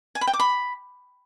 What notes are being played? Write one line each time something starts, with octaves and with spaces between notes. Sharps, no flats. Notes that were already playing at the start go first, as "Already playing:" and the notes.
G#5
B5
G5
D6
B5